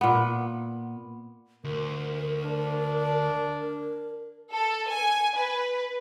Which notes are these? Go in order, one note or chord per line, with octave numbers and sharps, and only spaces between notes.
A#2 B3
D2 A#4
D4
A4
G#5
B4